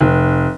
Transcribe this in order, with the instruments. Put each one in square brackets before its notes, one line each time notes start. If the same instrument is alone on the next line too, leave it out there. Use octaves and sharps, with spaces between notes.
[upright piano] F1